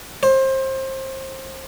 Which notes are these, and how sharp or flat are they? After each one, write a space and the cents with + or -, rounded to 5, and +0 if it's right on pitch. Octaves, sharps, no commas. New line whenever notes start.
C5 +25